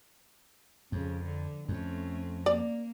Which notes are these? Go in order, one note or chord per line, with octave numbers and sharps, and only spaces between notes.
F2 C#3 F3
D3
F2 A3 C4 C#4
A#3 D5